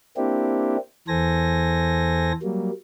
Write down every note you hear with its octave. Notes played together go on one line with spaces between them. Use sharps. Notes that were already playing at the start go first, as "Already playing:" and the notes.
A#3 C4 D4 E4 G4
E2 E3 A4 C5 G#5 A#6
F#3 G3 A#3